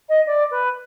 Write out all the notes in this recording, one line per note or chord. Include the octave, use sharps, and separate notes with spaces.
D#5
D5
B4